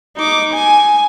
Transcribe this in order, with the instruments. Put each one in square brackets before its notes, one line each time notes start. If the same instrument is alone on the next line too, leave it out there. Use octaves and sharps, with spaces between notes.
[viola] D#4 D6
G#5